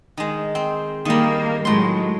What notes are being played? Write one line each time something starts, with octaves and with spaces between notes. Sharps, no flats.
D#3 G#3
C4
D#3 G3 A#3
A2 F#3 G#3 C6